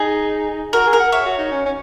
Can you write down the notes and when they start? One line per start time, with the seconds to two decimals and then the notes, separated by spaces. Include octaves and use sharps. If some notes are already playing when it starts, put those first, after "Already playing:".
Already playing: D#4 G#4
0.73 F#4 A#4
0.87 G#4
0.93 A#4
1.00 F#5
1.12 C#5 E5
1.26 F#4
1.38 D#4
1.51 C#4
1.66 C#4